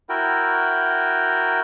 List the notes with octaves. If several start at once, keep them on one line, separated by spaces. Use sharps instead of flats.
E4 F#4 A#4 G5